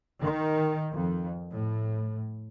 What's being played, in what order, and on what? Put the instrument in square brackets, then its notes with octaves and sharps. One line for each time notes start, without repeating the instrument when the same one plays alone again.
[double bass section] D#3
F2
A2